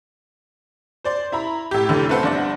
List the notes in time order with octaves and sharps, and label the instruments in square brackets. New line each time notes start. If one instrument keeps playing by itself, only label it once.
[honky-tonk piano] C5 D5 C6
E4 A#5 B5
A2 G4
F1 D3 E3 G4
A3 C4 A4 B4 C5 F#5
G1 D4 F#5